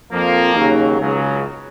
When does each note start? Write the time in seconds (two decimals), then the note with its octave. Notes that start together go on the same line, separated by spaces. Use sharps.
0.12 F2 F3 A#3
0.56 D#2 C#3 F#3
1.00 C#2 C#3 F#3